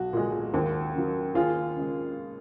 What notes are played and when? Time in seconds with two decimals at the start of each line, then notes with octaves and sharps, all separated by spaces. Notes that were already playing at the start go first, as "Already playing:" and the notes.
Already playing: B1 F#4
0.13 A#2 G#3
0.54 D#2
0.94 C#3 F#3
1.35 D#2 F4 G#4
1.76 C#3 G#3